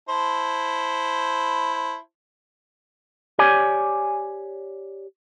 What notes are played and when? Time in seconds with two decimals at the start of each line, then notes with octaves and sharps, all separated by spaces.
0.09 E4 C5 A5
3.39 G4 C#5 D5 G#5